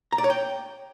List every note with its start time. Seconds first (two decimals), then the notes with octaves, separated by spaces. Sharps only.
0.12 A#5
0.18 D5
0.24 C#5
0.30 G5